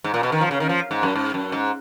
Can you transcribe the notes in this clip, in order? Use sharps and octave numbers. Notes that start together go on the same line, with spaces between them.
G#2
A#2
B2
D#3
F3
C#3
D#3
F3
G#2
F#2
G#2
F#2
G#2